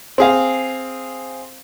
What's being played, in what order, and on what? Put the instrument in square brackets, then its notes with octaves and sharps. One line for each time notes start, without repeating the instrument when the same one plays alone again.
[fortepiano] C4 G#4 F5